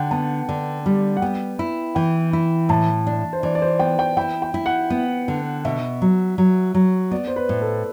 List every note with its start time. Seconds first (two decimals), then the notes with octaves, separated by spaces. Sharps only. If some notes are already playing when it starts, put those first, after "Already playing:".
Already playing: D3 F#5 G5
0.11 B3 A5
0.49 D3
0.86 G3
1.17 F#5
1.22 B3 G5
1.59 E4
1.95 E3 G5
2.33 E4
2.69 A2 A5
3.07 D4
3.33 C5
3.43 E3 D5
3.55 D5
3.62 C5
3.79 B3 G5
3.99 G5
4.17 E4 G5
4.42 G5
4.54 E4
4.66 F#5
4.90 B3
5.28 D3
5.65 B2 E5
6.02 F#3
6.38 F#3
6.75 F#3
7.11 B3 D5
7.27 C5
7.36 B4
7.49 A2
7.61 A4